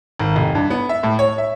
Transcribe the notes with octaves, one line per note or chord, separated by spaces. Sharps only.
G#1
F1
G2
B3
E5
A2
C#5
E5